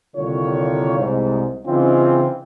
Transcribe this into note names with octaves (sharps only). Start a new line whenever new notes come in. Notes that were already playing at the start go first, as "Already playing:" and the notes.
C2 D3 D#3 A#3 F4 C#5
C2 G#2
C#3 E3 C4 C#4 D#4 F4